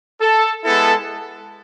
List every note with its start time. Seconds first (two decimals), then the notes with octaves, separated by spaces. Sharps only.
0.21 A4
0.64 G#3 B3 E4 A4